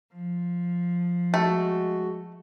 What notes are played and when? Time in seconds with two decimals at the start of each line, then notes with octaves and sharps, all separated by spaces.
0.13 F3
1.34 G#3 A3 F#4